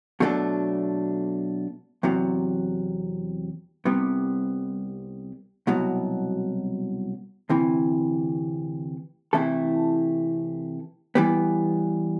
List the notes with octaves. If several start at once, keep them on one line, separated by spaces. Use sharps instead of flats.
B2 F#3 A3 D4 A4
E2 C3 F#3
C2 C3 G3 B3
C2 B2 F#3
D2 C3 E3
C3 E3 A3 E4 A4
E3 G3 B3